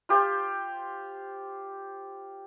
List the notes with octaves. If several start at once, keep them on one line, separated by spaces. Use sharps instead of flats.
F4 G4 C5 F5